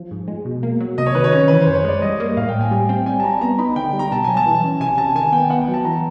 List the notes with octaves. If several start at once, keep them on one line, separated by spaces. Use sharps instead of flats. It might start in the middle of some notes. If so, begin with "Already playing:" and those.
Already playing: F3
G#2
G#3
B2
A#3
F#3
C3 D#5
C#5
D#3 B4
C#5
C#4
E3 B4
C5
F#2
C#5
G#3 D5
G3 D#5
A#3
A2 F5
G5
A2
G#5
G3 G#5
C4 G5
G3 G#5
A5
G3 A#5
B3 A#5
D#4 B5
D3 G5
G3
A#5
B2 A5
F#3 G#5
A5
E3
C#4
C3 G#5
C3 A5
D#3 G#5
B3 G5
B3 F#5
G5
F#3
A5
E3 A#5